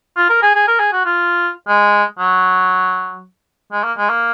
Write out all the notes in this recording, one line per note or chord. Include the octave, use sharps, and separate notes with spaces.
F4
A#4
G#4
G#4
A#4
G#4
F#4
F4
G#3
F#3
G#3
A#3
G#3
A#3